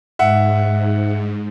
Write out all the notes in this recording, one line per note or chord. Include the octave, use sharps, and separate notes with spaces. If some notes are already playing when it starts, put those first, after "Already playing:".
G#2 E5 F#5